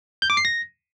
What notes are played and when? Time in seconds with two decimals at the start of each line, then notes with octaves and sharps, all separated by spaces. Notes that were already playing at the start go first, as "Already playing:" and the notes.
0.22 G6
0.30 D6
0.37 C7
0.45 A#6